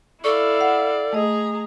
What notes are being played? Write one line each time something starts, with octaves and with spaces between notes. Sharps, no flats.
E4 A4 D5 F5 C#6
F#5
A3 G#4 D#5 A#5